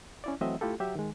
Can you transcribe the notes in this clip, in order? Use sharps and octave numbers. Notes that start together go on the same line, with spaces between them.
C#4 E4 D5
E3 F#3 A3 C4 D#5 E5
A3 E4 F4 G4 A4
F#3 G4 E5
D#3 G#3